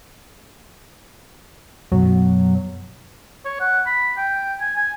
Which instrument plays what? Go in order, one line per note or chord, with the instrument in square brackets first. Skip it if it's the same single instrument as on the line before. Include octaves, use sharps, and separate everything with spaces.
[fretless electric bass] F#2 B2 [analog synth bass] F#3
[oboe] C#5
F#5
B5
G5
G#5
G#5